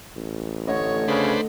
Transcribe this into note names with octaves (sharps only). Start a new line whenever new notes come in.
A1
D3 A3 C#5 D#5
C#3 D4 B4 C5